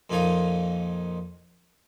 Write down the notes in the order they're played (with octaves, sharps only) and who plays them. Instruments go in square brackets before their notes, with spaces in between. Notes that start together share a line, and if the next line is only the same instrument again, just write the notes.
[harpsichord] F2 A#2 D#4 F4 G#5